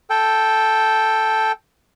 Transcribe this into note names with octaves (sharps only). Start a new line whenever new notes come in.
A4 G5